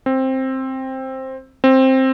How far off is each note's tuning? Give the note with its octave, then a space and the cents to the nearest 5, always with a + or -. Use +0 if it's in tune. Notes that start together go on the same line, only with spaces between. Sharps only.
C4 +10
C4 +10